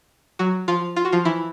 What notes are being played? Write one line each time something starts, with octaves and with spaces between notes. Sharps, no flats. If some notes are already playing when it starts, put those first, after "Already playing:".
F#3 F#4
F3 F4
F4
F#4
F3 F4
E3 E4